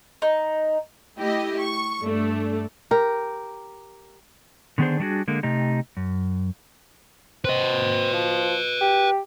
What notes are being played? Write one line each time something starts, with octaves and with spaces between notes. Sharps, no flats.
D#4
A3 E4 G4 D#5
C#6
G2 A3 D4
G4 A#4
D3 D#3 B3 D4 G#4 C5
G3 A3 D4 E4 F#4 G#4
D3 G#3 A#3
C3 A3 D#4 G4
F#2
C4 B4 D#5
F3
G4